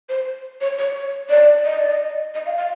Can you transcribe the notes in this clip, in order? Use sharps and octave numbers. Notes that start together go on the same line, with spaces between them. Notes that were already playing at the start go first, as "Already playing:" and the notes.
C5
C#5
C#5
C#5
D5
D#5
D5
D#5
D#5
F5
F5